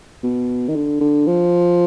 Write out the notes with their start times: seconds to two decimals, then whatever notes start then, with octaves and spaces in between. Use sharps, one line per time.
0.23 B2
0.69 D#3
0.75 D3
1.01 D3
1.27 F3